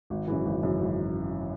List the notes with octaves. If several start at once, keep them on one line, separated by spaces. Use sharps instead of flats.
G#1
F#2 C#3 E3
G#1
F#2 C#3 E3
G#1